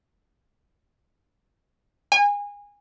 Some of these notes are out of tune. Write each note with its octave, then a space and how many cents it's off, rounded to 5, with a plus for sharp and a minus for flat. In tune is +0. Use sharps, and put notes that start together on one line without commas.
G#5 -25